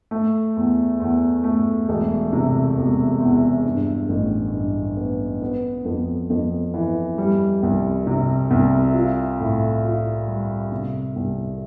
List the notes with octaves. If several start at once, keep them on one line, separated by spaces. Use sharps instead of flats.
A3
E2
E2
A3
E1
C3
E1
E2
G2
A1
G2
B3
B3
F2
F2
E3
G3
C2
C3
C2
F4
A2
F4
G3
C3
C2